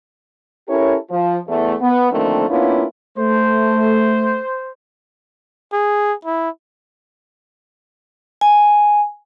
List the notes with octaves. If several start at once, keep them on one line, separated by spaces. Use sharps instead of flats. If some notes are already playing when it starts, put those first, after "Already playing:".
C#4 E4 G4 A4 A#4 C#5
F3
E2 A3
B3
D3 D#3 F3 A3 A#3 C4
A#3 B3 C#4 D4 E4 F4
A3 C5
G#4
E4
G#5